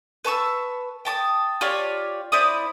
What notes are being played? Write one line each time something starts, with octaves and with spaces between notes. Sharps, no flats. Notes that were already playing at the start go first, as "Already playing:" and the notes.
B4 A5 C#6 E6
G5 A5 D6 D#6
F4 G4 C#5 D5
C4 E4 D5 D#6